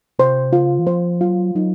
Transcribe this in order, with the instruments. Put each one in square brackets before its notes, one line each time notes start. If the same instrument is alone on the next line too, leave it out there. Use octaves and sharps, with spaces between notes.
[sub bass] C3 [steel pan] C5
[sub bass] C#3 [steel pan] F4
[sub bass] E3
[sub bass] F3 [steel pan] C5
[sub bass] F#3 [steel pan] F4
[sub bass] F#3 [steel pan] D#4